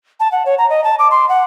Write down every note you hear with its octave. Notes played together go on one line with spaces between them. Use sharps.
A5
F#5
C#5
A#5
D#5
A5
D6
C6
F#5